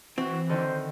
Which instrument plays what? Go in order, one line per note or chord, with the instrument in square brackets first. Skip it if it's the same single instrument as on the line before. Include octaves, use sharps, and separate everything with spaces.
[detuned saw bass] E3 [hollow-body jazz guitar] C4 [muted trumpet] F#4
[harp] D3 D#3 A4 [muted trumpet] C5